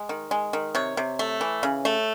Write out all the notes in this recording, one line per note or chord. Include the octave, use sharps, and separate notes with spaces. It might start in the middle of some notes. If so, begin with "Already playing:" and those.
Already playing: G#3
D#3
G#3
D#3
C3 C#5
C3
A3
E3
C#3
A3